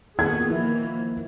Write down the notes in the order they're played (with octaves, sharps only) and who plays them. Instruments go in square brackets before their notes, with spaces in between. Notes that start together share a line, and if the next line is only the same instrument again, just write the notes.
[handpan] A#2 D#3 F#4 [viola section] B3 G#4 A4 [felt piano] G#6
[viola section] E3 A#3 [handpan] F3 E4